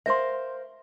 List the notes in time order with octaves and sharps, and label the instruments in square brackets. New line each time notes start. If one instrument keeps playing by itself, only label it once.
[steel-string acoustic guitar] A#4 C5 F5 [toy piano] E5 C6